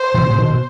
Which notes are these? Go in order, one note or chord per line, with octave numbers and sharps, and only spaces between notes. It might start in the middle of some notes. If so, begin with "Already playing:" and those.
Already playing: C5
C3 E3
A2 C3
B2 D#3
B2